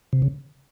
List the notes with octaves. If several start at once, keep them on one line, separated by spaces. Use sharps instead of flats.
C3
C#3